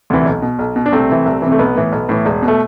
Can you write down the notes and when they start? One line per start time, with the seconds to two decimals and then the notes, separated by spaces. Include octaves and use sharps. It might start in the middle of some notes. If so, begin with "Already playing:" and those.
0.10 D2 C3 E3
0.25 B1
0.42 B2
0.59 B1
0.76 B2
0.86 D4
0.92 C2 A3 C4
1.09 C3 E3
1.25 C2
1.42 C3 E3
1.52 A3
1.58 B1 B3
1.76 A2 E3
1.92 B1
2.09 A2 E3
2.26 E1
2.42 B2
2.48 A3